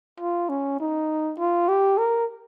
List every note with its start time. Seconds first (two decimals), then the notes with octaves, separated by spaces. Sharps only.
0.20 F4
0.49 C#4
0.80 D#4
1.39 F4
1.68 G4
1.98 A#4